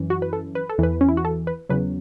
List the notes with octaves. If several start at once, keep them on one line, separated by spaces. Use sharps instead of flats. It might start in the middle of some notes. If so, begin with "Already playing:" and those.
Already playing: F#2 E3
F#4
B4
A4
B4
A4
E2 E3 B4
C#4
E4
F#4
A4
B4
E2 C#3 F#3 B4